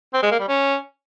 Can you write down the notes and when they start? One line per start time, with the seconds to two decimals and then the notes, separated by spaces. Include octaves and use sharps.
0.14 C4
0.22 G#3
0.31 A#3
0.40 G3
0.48 C#4